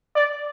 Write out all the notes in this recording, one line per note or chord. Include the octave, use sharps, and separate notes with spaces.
D5